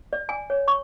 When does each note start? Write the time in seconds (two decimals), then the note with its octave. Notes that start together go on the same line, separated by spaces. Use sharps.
0.13 D5
0.29 G#5
0.50 C#5
0.68 C#6